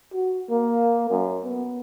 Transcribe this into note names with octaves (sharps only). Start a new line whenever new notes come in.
F#4
A#3
F#2
B3